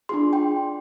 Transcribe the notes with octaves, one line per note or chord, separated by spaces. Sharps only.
D4 F4 G#4 C6
G5